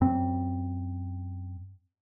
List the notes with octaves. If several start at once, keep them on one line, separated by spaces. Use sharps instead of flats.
F#2 C4